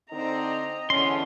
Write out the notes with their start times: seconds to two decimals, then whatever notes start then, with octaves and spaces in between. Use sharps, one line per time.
0.12 D3 C4 D#4 D#5 A#5
0.90 E2 D3 C#4 C6